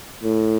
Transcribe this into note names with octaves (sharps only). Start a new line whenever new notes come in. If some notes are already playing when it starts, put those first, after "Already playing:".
A2